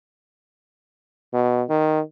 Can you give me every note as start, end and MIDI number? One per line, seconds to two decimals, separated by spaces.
1.33 1.63 47
1.70 2.00 51